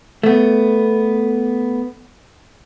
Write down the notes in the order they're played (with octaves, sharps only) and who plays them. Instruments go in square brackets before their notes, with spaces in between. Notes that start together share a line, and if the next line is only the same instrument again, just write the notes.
[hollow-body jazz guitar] A3 B3